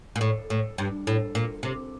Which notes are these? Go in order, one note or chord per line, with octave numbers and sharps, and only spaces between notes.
A#2
A2
A2
G2
A2
A#2
C3